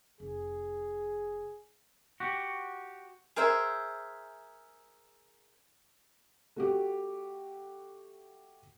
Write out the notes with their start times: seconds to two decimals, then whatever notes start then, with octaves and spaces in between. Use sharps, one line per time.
0.20 F1 G#4
2.20 F#4 G4
3.36 G#4 A#4 C5 E5
6.56 A3 F#4 G4